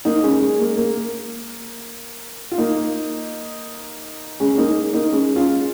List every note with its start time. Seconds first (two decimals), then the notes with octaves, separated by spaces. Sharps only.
0.05 A#3 D#4
0.23 G#3 C#4
0.41 G#3
0.59 A#3
0.77 A#3
2.51 F4
2.58 A#3 D#4
4.40 G#3 C#4
4.58 A#3 D#4
4.93 A#3 D#4
5.12 G#3 C#4
5.36 C#4 F4